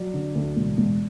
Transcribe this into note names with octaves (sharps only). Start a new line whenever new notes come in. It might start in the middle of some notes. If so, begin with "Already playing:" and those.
Already playing: F#3 D5
D3
D2
E1
E1